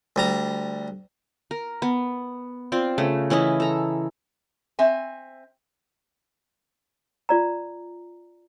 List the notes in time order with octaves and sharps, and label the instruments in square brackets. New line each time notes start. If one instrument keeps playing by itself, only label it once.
[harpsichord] D2 G3 A#5
[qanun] A#4
B3
C4 F4 D5
C#3 A3
E3 C#4 E4 D#5
A4 A#5
[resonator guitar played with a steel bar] C4 E5 G#5
[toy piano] F4 D5 A#5